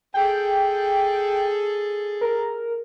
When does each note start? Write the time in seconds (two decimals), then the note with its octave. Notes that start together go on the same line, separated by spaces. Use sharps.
0.14 G#4 A4 G5
2.21 A#4